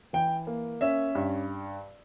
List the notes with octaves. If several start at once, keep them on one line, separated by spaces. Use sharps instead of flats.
E3 G5
A#3
C#4 E5
G2